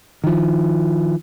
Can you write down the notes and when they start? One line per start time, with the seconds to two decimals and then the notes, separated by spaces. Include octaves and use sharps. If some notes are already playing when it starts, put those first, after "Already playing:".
0.24 D#3 F3